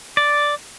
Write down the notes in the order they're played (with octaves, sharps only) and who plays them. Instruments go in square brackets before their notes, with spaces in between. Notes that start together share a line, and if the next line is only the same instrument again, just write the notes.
[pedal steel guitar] D5